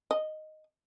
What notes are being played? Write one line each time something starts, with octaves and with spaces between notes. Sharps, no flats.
D#5